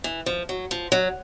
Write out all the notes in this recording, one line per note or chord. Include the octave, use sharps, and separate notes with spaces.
E3
F3
F#3
F3
F#3